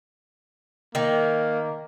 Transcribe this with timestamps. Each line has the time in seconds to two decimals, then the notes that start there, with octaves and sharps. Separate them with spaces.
0.95 D#3 A#3